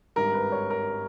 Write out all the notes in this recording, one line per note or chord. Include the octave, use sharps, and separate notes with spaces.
G#1 G2 G3 A#4
B4
C#5
A#4